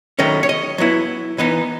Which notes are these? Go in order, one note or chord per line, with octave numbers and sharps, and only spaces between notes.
D#3 F#3 A3 C#4 D#5
C#5
D#5
F#3 B3 E4
E3 B3 D#4 D#5